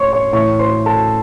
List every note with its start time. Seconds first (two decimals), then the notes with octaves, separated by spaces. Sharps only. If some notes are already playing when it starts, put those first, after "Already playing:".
Already playing: A2 C5 C#5 C6 C#6
0.12 C#5 C#6
0.32 A2 E3 C#5 C#6
0.59 C5 C6
0.86 A4 A5